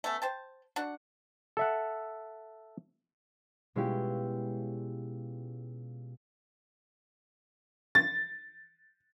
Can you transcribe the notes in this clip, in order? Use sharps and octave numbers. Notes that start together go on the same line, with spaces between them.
A3 B3 C#4 A4
C5 G5 A5
D4 F#4 F#5
A4 E5 F#5
B2 G#3 C#4 E4 F4 G4
A6